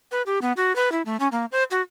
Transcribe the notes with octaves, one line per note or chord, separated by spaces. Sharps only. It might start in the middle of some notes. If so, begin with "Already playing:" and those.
B4
G4
B3
F#4
B4
E4
A3
C#4
A#3
C5
F#4